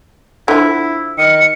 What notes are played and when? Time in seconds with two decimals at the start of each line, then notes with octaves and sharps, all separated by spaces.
0.48 D3 F3 E4
1.18 D#3 C#7